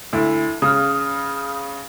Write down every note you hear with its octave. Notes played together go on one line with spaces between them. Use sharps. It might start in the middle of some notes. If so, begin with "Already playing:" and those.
D2 E4
C#3 D#6 F6